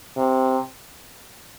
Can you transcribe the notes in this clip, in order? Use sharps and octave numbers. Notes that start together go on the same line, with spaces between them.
C3